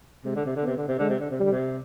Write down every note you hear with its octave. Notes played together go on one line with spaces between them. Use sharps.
C3 G#3
D3
C3
D3
C3 B3
D3
C3
D3 G#3
C3
D3
C3
D3 G3
C3